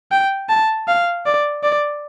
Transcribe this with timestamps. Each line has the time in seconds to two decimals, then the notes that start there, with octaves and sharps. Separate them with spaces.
0.12 G5
0.49 A5
0.88 F5
1.26 D5
1.63 D5